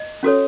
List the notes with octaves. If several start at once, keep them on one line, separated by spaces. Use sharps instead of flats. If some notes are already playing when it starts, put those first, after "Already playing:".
Already playing: D#5
C#4 F#4 A4 C#5